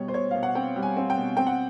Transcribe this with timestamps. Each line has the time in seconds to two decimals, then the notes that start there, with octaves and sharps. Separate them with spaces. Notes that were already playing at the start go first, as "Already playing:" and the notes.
Already playing: B2 G3 C#5
0.08 C5
0.14 B2 C#5
0.31 B2 F5
0.43 F#5
0.55 C4 G5
0.76 G3
0.82 G#5
0.97 C4
1.10 G5
1.17 B2
1.37 C4 G5
1.47 F#5